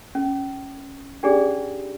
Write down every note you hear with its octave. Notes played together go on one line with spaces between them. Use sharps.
C#4
C#4 D4 G4 G#4 D5